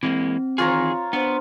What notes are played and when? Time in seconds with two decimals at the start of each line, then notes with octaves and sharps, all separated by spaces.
0.03 E3 G#3 A#3 C4
0.58 D#3 E3 F4 G#4 C#5 A#5
1.13 B3 D4 C5